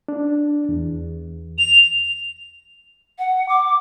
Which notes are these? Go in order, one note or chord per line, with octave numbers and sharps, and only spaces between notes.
D4
E2
F7
F#5
D6